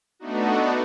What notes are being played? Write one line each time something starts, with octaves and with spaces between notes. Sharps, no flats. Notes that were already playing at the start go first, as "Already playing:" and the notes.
A3 B3 D4 D#4 F#4